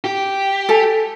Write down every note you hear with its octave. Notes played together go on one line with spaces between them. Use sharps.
G4
A4 G#5